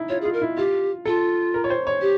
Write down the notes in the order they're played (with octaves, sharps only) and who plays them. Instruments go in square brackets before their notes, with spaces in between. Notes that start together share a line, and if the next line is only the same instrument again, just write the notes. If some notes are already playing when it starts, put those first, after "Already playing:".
Already playing: [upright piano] D#4 E4
[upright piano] F4 [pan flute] C#5
[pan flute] G#4
[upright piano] F4
[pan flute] A#4
[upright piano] E4
[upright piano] F4 [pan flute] G4
[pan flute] F4 [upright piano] A4
[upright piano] A#4
C#5
C5
C#5
[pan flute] G4